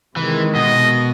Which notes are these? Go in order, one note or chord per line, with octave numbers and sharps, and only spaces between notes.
C3 D#3 E3 G#3
B2 D#5